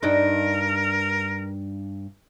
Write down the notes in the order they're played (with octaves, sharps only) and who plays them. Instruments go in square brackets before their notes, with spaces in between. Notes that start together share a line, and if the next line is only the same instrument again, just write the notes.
[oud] G2 D4 D#4 [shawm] A#4